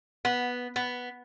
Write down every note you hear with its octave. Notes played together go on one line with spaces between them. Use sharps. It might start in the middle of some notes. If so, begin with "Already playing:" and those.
B3
B3